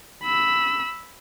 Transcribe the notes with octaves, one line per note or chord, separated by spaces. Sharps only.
B5 E6